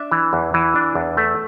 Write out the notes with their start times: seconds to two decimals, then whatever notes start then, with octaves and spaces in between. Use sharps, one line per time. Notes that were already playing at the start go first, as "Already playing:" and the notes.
Already playing: D4 E5
0.12 E3
0.33 E2
0.54 E3
0.75 D4
0.95 E2
1.17 A3